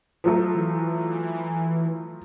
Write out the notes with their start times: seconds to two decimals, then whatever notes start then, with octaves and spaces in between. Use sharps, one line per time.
0.24 F3 F#3 A3
0.55 E3